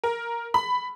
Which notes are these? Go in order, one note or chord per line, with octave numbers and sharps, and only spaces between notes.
A#4
B5